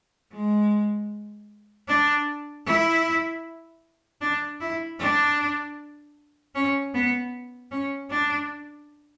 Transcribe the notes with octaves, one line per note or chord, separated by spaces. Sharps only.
G#3
D4
E4
D4
E4
D4
C#4
B3
C#4
D4